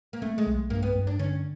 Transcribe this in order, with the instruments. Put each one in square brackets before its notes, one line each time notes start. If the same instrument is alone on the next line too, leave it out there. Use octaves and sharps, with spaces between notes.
[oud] A#3
[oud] A3 [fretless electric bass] C4
[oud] G#3
[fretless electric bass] B1
[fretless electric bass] G2 [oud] A#3
[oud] B3
[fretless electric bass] G2
[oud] D4
[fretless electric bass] D3 [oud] C#4